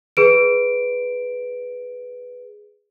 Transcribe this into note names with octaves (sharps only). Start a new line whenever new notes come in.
G#4 B4 D7